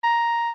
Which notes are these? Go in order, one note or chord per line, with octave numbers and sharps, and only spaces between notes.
A#5